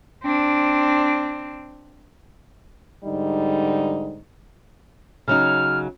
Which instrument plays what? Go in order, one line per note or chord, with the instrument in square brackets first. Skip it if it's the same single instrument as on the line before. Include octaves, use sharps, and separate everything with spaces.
[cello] C4 D4
[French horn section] G#2 D3 G3 D#4
[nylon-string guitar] C#3 F#3 D#4 [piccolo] F6